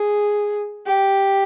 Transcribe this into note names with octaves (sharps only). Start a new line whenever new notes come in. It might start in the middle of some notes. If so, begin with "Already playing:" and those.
Already playing: G#4
G4